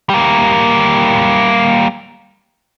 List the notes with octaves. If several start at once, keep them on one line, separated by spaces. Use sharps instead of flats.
G3 A#3